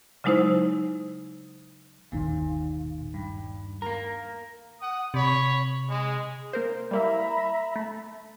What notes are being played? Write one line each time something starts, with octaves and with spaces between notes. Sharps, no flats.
C#3 F#3 G#3 D#4 E4 C5
G1 D#2 A#2 D#3
G2
A#3 A#4 A#5
F#5 D#6
C3 C#5 B5
G#3
A#3 A#4 C5
G3 A#3 E4 E5 A#5 B5
A3